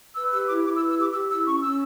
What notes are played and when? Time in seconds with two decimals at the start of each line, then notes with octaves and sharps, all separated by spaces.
0.16 B4 E6
0.32 G4 E6
0.47 E4 D6
0.64 E4 D6
0.76 E6
0.81 B4
0.89 E6
0.97 G4 D6
1.13 G4 E6
1.29 E4 E6
1.45 C#4 C#6
1.61 C#4 E6